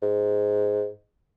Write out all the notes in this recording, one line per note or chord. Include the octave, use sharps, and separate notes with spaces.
G#2